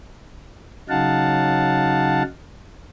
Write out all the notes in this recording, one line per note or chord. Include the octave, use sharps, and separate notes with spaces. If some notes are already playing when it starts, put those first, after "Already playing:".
C#3 F#3 D#4 F5 F#5 A5